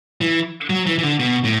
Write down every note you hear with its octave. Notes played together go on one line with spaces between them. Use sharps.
E3
F#3
E3
E3
D3
B2
A2